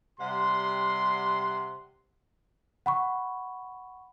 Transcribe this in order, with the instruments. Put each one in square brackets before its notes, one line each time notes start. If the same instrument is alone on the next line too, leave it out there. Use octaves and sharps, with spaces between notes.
[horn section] C3 G3 F#5 C6
[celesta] F#5 B5 C#6